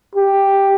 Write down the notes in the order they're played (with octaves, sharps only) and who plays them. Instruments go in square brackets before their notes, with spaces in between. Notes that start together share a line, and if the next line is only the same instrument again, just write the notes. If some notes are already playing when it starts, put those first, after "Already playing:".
[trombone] G4